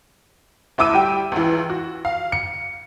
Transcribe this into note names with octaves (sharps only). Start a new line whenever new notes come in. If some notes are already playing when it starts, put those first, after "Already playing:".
D2 E4 D6 E6 D#7
G3 G4 G5
C#2 E3
F#4
F5
C#7